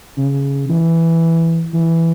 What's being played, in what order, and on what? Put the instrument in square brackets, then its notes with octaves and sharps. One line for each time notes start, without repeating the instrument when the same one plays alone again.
[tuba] C#3
E3
E3